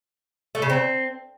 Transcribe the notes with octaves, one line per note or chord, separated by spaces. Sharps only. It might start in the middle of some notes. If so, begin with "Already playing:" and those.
A3
C#3
C4